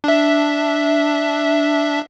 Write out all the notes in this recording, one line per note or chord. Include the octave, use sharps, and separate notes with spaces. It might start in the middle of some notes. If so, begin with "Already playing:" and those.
D4 E5